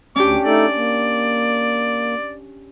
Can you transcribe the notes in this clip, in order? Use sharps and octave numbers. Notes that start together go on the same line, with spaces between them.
D2 C#4 D4 G4 D6
A3 D#4 A4 D5
A#3